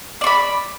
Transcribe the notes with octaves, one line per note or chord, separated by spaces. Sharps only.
D5 B5 C#6